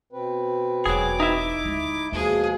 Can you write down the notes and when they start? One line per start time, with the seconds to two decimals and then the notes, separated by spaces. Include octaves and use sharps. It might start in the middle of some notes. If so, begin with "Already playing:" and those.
0.13 B2 C4 B4
0.86 E1 F#3 G#4 D6
1.20 D#4 E4 E5
1.65 D2 G#3
2.12 D#2 B2 F3 G#3 G#4